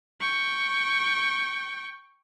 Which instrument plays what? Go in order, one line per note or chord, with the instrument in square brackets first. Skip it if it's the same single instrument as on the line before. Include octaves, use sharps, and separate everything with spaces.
[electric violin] G5 C#6